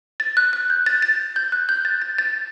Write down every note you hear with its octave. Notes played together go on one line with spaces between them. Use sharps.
A6
F#6
F#6
G6
A6
A6
G6
F#6
G6
A6
A6
A6